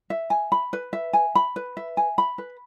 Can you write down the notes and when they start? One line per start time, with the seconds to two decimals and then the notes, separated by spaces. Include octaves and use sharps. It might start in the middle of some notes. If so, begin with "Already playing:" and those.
0.10 E5
0.30 G#5
0.52 B5
0.73 B4
0.93 E5
1.13 G#5
1.35 B5
1.56 B4
1.77 E5
1.97 G#5
2.18 B5
2.38 B4